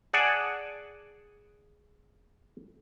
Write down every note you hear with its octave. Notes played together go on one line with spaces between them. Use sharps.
G#4 D5 F#5 G#5 A5